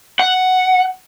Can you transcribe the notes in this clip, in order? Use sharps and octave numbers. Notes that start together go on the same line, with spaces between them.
F#5